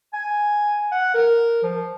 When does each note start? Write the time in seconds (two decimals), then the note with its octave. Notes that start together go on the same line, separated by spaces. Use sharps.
0.13 G#5
0.92 F#5
1.15 A#4
1.63 F3